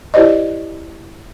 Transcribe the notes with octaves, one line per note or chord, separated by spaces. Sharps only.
E4 G4 C5 D5 D#5